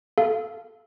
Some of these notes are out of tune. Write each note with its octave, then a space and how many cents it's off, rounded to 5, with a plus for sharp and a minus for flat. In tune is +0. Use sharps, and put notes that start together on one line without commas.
A4 -10 F5 -20